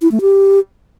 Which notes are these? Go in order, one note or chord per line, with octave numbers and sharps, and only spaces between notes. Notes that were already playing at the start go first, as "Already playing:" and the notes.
E4
A3
G4